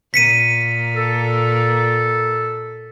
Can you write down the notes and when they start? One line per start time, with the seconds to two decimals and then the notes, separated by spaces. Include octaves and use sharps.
0.14 A#2 B6 C#7 D#7
0.96 A4